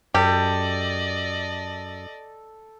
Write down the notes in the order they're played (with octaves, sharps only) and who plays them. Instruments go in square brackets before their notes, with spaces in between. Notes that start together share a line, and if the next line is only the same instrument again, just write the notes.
[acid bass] F#2 [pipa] G4 [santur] A4 [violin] D5 D#5